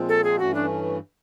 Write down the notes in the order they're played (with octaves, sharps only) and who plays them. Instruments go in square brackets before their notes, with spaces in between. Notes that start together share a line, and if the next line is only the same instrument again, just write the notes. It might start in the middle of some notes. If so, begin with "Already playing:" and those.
Already playing: [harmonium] A#2 F3 G#3 C4 F4
[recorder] A4
G#4
[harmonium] G2 E3 A3 C#4 [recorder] F#4
[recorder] D4